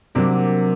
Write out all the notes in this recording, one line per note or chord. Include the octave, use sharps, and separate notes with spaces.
C3 F#3 A#3 D4